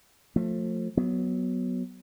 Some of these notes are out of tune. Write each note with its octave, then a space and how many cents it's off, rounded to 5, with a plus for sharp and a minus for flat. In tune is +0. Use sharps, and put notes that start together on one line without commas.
F3 +30 A3 +25
F#3 +0 B3 +0